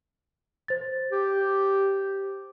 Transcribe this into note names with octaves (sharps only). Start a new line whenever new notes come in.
C5 A6
G4